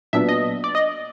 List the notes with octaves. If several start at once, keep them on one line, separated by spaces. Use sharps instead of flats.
A#2 F#3 B3 D4 E5
D#5
D5
D#5